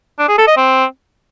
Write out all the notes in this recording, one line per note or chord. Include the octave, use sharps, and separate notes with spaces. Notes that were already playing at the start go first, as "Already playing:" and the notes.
D4
G#4
A4
D#5
C4